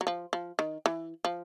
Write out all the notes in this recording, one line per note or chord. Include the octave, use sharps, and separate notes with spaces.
F#3
F3
F3
D#3
E3
F3